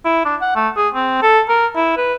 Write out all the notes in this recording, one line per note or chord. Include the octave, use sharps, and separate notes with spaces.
E4
D4
F#5
A3
G#4
C4
A4
A#4
E4
B4